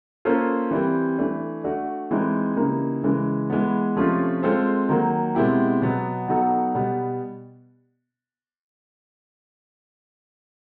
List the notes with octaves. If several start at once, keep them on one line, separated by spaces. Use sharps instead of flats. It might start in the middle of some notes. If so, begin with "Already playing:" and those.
A#3 C#4 F4 A4 C5
E3 G3 C4
E3 A3 D4
A3 D4 F#4
E3 G#3 C4 D#4
C#3 E3 G3 A#3 D#4
C#3 E3 G#3
E3 G#3 B3
C3 F3 A3 C#4 F4
G#3 C4 F4 A4 C5
D#3 F#3 A#3
B2 G#3 C4 E4 G4
B2 F#3 B3
F#3 B3 D#4 F#4 A4
B2 G3 B3